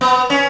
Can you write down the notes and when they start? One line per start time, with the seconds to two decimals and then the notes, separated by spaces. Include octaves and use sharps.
0.01 B3
0.30 C#4